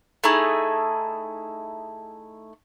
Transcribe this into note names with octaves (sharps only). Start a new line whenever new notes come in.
A3 D#4 E4 G#4